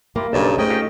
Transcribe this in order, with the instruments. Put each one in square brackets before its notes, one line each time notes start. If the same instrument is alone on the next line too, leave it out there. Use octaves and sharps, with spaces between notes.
[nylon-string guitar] A#3 [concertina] E4 F4 G4
[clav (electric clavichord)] B1 C#3 [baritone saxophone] G2 [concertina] D#4 A5
[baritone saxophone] G#2 [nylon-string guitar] A3 [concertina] C#4 D#5 G5
[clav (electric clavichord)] D#4 F4 G4